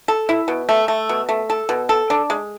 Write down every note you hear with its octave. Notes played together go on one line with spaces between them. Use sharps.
A4
E4
B2
A3
A3
B2
A3
A4
B2
A4
D4
G#3